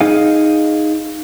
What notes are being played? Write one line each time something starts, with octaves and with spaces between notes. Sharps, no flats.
D#4 G#4 D#5 F5